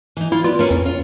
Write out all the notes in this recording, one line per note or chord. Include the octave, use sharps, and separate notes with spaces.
E3 D#4
E4 F4
B3 F4 D5
A#3 C#4 B4
F2 C#3
F4